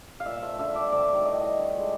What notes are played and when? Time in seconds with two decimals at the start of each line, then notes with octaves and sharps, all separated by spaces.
0.20 F5
0.26 A#2 E5
0.42 F3 A3 E5
0.59 D3 E5
0.75 G3 D5
0.92 C3 D5
1.09 D#3 F#3 A3
1.25 A2 D#5
1.41 E3 G3 D#5
1.58 D3
1.75 F3 G#3